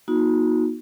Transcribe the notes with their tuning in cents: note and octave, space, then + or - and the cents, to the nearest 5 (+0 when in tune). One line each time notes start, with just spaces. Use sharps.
B3 -45 D#4 +15 F#4 -30